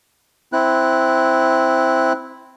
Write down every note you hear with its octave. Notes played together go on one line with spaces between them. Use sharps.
C4 E4 F#6